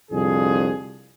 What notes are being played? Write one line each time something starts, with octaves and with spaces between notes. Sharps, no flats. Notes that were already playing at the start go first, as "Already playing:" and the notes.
C2 F2 D3 G#4